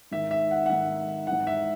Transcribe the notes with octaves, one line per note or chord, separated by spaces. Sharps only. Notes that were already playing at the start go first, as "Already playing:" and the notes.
G#2 D#3 E5
E5
F#5
F#5
G#2 D#3 E5
G#2 E3 F#5
E5